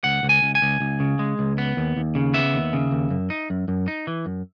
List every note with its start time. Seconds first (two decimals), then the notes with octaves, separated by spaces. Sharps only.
0.04 C#2 F#5
0.23 C#2
0.29 G#5
0.43 C#2
0.55 G#5
0.62 C#2
0.80 C#2
1.00 C#3
1.19 G#3
1.39 C#2
1.58 B3
1.77 D#2
1.97 D#2
2.15 C#3
2.34 B3 E5
2.54 D#2
2.73 C#3
2.91 D#2
3.10 F#2
3.30 D#4
3.50 F#2
3.68 F#2
3.88 D#4
4.07 E3
4.26 F#2